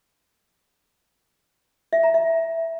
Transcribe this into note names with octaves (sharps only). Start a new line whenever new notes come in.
E5
A#5
E5